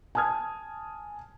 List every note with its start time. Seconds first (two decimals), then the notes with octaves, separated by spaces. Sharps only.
0.15 G#5 A5 D#6 F6 G#6